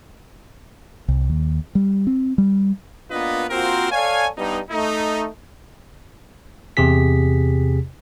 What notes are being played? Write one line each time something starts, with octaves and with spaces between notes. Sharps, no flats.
C2
D#2
G3
C4
G3
A#3 B3 D4 F4 B4 D#5
A#3 C4 F4 F#4 A#4 C5
A4 C#5 D5 F5 G#5
G2 G3 B3 D#4
A3 D#4
E2 C3 G4 G#4 B6